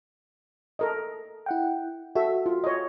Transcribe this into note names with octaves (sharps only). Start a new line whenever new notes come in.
A4 A#4 D#5
E4 F#5 G5
F#4 A4 E5
F4
C#5 D#5